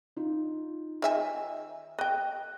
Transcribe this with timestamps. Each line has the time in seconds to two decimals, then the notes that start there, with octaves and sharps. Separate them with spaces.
0.16 D#4 F4
1.02 D#3 E5 G#5
1.99 D#5 G5 F#6